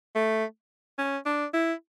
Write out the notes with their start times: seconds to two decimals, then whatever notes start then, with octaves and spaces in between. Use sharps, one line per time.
0.16 A3
0.98 C#4
1.26 D4
1.54 E4